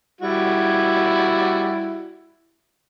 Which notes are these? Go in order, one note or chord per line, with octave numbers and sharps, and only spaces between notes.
G3 E4 F#4